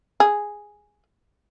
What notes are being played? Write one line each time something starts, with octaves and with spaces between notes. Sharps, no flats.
G#4